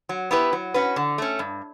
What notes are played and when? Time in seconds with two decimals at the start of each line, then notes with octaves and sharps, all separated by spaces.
0.09 F#3
0.31 B3 E4 G4 B4
0.53 F#3
0.74 C#4 F#4 B4
0.96 D3
1.18 A3 C#4
1.39 G2